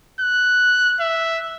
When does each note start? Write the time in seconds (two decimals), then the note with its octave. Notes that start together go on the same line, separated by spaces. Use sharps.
0.21 F#6
1.00 E5